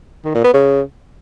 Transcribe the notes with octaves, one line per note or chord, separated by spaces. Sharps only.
D#3
A#2
B3
C#3